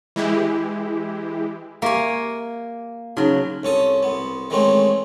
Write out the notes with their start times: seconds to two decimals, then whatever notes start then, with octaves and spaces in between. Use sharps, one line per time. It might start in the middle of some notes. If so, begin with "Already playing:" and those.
0.16 E3 G#3 E4 G4
1.82 A#3 G4 E5 F5 G#5
3.17 C#3 F#3 D#4 F#4
3.63 C2 C#4 A4 D#6
4.03 C2 B3
4.50 D#3 E3 G#3 A3 C4 C#4